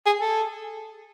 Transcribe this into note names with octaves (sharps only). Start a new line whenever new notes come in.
G#4
A4